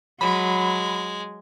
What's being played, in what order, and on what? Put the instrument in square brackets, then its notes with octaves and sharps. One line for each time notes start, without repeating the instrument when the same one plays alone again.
[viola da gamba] F#3 [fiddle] G#3 [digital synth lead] B5